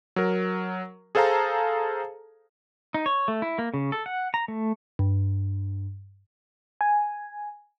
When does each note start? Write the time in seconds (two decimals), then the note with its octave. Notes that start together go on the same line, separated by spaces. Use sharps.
0.16 F#3 A#4
1.15 G#4 A4 C5 F5 A5 A#5
2.94 D#4
3.06 C#5
3.28 A3
3.42 E4
3.58 A#3
3.74 C#3
3.92 A4
4.06 F#5
4.34 A#5
4.48 A3
4.99 G2
6.81 G#5